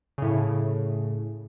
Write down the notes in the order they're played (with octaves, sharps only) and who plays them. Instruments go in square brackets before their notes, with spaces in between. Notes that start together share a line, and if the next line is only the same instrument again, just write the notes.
[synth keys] A2 C#3